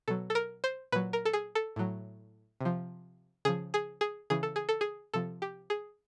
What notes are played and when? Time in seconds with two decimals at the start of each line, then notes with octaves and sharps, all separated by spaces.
0.08 B2 F#3 A4
0.30 A4
0.35 A#4
0.64 C5
0.92 A#2 F#3 B4
1.13 A#4
1.25 A4
1.33 G#4
1.55 A4
1.76 A2 F#3
2.61 C3 F3
3.45 C#3 F3 G#4
3.74 G#4
4.01 G#4
4.30 C#3 E3 G#4
4.43 A4
4.56 G#4
4.69 A4
4.81 G#4
5.14 C3 F3 A4
5.42 G4
5.70 G#4